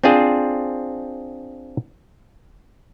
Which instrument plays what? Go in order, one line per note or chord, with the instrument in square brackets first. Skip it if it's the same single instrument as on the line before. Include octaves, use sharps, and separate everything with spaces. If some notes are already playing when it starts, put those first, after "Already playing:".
[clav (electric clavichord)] C4 D4 F4 G#4 C5